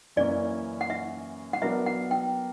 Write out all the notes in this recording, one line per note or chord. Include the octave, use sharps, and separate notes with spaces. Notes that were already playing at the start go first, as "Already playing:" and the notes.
F#2 E3 A#3 C#4 D5
F#5
E5
F#5
F#3 B3 D4 A#4 E5
F#5
G5